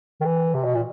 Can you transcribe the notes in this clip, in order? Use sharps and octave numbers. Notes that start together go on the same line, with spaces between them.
D#3
E3
C3
B2
A#2